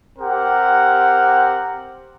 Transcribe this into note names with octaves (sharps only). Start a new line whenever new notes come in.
C4 G4 A#4 F#5